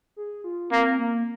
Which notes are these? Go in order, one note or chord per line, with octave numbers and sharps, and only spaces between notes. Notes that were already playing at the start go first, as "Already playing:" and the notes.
G#4
F4
A#3 C4
A#3